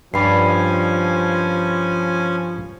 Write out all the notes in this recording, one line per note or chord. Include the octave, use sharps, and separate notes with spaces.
G2 F3 C#4 D5 G#5 B5 C7